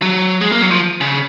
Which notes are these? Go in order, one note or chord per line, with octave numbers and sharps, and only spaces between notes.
F#3
G#3
A#3
F#3
F3
C#3